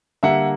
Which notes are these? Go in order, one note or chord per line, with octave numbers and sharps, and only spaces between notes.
D3 G3 A#3 E5 F#5